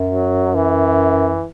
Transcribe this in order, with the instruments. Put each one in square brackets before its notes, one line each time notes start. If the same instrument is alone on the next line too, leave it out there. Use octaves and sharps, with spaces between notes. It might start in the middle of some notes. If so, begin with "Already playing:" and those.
Already playing: [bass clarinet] F#2
[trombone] F#3
E3